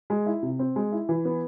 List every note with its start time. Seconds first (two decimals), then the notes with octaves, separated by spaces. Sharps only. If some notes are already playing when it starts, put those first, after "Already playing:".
0.10 G#3
0.26 E4
0.43 C3
0.59 C4
0.76 G#3
0.92 E4
1.09 E3
1.25 B3